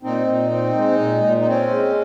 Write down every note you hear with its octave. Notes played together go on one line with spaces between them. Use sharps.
A#2 C4 D#4
A#2
C4
G#3
A#2
A#2
D#4
C4 C#4
G#3